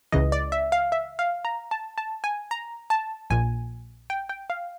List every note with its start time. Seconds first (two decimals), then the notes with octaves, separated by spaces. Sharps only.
0.12 C#2 C#3 E3 D#5
0.32 D5
0.52 E5
0.72 F5
0.92 E5
1.19 F5
1.45 A#5
1.71 A5
1.98 A5
2.24 G#5
2.51 A#5
2.90 A5
3.30 A#1 A#2 G#5
4.10 G5
4.29 G5
4.50 F5